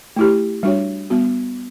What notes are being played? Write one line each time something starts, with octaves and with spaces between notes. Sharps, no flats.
A3 E4 G4
G3 D4 F#4 C#5
G3 B3 F#4